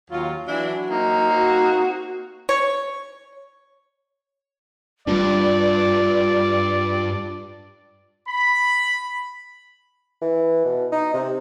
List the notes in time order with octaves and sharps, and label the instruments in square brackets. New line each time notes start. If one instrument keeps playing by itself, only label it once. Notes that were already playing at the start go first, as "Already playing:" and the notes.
[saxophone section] D#2 F#3 F4
[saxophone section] E3 D4 E4 [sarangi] F#3
[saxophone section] A#3 C4 D#4
[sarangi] F#4
[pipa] C#5
[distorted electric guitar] G2 [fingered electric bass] G3 A#3 D4 [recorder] F4 [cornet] D5
[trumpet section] B5
[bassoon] E3
B2
D#4
C3